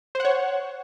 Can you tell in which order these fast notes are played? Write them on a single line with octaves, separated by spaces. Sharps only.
C5 F#5 C#5